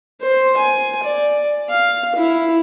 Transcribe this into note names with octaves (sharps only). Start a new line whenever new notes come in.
C5
G#5
D5
F5
E4